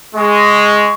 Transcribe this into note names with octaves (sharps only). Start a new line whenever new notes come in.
G#3 C#6